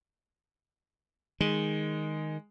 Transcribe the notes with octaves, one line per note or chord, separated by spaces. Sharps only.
D#3 G#3